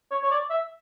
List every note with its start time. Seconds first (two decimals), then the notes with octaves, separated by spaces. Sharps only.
0.11 C#5
0.23 C#5
0.31 D5
0.50 E5